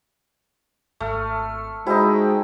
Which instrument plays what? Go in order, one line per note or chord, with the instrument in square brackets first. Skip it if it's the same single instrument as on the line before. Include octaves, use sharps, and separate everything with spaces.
[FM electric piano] G#1 F6 [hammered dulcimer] A3
[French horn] G#3 [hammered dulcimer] D#4 E4 [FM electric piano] F#4 C5 G5